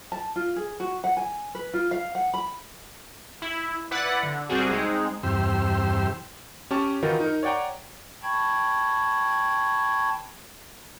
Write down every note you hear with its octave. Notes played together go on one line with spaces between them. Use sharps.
A5
F4
G#4
F#4
F#5
G#5
B4
F4
F5
F#5
B5
E4
E4 B4 D5 F#5
D3
C2 G3 C4 F#4 G#4
G#3 C4 D#4 G#4
E2 G2 C3 G4 C6 E6
C#4 G4 A5 C#6
D#3 E3 D#4 F4 F#4 A#4
D#4 A#4
C#5 D5 F#5 G5 A#5
G5 A5 B5 C#6 G#6